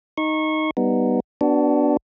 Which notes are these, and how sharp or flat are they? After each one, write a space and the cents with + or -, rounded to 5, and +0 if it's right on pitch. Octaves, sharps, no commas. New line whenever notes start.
D#4 +0 C#6 -25
G3 +0 B3 +0 D#4 -5
B3 +0 D4 +0 F#4 +35